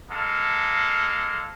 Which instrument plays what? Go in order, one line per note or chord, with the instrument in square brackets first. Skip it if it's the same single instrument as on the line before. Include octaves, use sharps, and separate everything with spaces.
[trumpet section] G#3 A#3 A4 F5